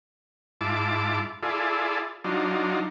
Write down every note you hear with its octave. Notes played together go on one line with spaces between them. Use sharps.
G#2 E4 F4 A5 D6
E4 F4 G#4 A4 D5
F#3 D4 D#4 F4